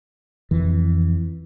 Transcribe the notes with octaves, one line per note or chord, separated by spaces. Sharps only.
F2 E3